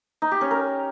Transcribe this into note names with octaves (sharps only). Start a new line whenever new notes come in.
D#4
G4
C#4
A#4